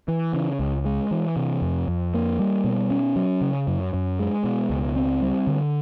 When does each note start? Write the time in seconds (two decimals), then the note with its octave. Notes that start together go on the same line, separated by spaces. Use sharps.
0.08 E3
0.33 C#3
0.60 C#2
0.85 G#3
1.11 E3
1.36 C3
1.62 F2
1.88 F2
2.14 A#3
2.39 G3
2.64 B2
2.90 C#4
3.16 F#3
3.41 C#3
3.68 F#2
3.94 F#2
4.19 G#3
4.44 B2
4.70 C#2
4.96 C4
5.22 G3
5.47 D3